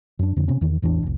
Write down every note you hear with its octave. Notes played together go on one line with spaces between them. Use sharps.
F#2 D4
F2 D3
C3 B3 C#4
E2 D#3
A1 E2 E3 D4
F1 C2